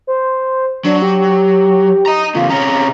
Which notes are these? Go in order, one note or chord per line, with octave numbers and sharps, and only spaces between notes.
C5
F#3 D4
G4
D#5 A#5
E2 C#3 F4
C3 C#4 A#5